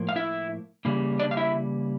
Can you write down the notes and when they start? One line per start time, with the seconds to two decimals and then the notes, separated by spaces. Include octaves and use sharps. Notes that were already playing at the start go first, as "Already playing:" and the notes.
Already playing: A2 F3 A#3
0.09 F5
0.16 E4 E5
0.85 C#3 E3 G3 A#3
1.20 D4 D5
1.31 F5
1.37 E4 E5